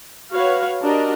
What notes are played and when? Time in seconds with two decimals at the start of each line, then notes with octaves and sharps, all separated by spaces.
0.33 F#4 B4 C#5 F5
0.81 D4 F#4 G4 A#4 D#5